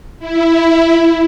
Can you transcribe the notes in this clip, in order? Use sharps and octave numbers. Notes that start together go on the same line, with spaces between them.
E4